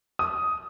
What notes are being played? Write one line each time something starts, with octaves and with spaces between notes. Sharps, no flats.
D#6